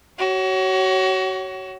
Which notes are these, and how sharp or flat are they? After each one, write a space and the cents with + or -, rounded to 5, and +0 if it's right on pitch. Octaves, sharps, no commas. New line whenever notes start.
F#4 +30 C#5 +0